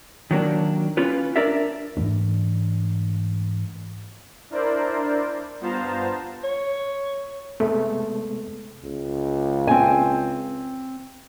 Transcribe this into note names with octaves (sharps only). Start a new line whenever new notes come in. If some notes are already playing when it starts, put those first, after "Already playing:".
D#3 F#3 A#3 D4
C#4 F4 B4
D4 A#4 D5 E5
G#2 E3 A3 D4
D4 E4 A#4 C5 D5
G2 B3 F4 C5 A5 A#5
C#5
C3 G#3 A3 B3
C#2
C4 G#5